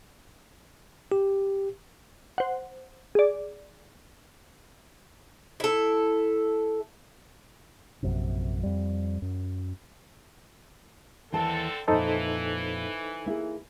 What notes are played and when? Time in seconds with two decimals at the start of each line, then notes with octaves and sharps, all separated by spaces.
1.12 G4
2.38 C5 F#5
3.15 G#4 D5
5.60 E4 A4
8.03 A#1 F#2 C3
8.63 F2 G3
9.22 F#2
11.32 D#2 D3 E3 C4 A4 A5
11.88 F2 A#2 E3 D#4 A4 C5
13.26 A#3 E4 G#4